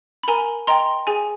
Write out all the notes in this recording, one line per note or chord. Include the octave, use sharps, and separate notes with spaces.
B5
A#4 G#5 A#5
D#5 G5 A#5 C6
G#4 G#5